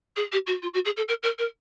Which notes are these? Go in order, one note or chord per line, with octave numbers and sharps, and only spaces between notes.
G#4
G4
F#4
F4
F#4
G#4
A4
A#4
A#4
A#4